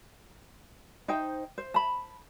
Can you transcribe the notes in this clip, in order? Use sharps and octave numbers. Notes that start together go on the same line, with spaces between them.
D#4 C5 D#5 G5
C5
A5 B5